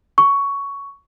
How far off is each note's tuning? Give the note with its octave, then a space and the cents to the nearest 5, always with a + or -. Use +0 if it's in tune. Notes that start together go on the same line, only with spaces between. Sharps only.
C#6 +10